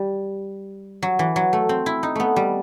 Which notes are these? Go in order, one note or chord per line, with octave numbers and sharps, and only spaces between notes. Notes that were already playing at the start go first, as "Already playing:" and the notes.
Already playing: G3
F#3
E3
F#3
A3
C4
E4
D#4
A3 B3
G3